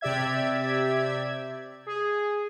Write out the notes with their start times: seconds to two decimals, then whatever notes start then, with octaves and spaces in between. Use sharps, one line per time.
0.01 C3 G4 D5 E5 G#6
1.86 G#4